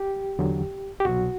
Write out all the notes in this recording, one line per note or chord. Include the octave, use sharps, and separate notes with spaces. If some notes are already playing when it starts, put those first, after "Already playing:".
Already playing: G4
E2 D3 F#3
G4
C2 B2 F#3 F#4